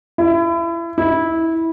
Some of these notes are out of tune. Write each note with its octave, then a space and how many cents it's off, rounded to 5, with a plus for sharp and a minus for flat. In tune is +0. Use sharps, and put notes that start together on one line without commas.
E4 +30
E4 -15